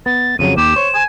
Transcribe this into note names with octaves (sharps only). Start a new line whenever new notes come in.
B3 A6
F2 C#3 F#3 D#7
D#2 G4 E7
C5 C#5
G#5